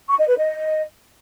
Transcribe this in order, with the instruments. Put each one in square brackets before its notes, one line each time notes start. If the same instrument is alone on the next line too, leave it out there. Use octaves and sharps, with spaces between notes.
[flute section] C#6
D#5
B4
D#5